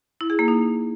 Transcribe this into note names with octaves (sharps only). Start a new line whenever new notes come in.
E4
G#4
A#3
D#4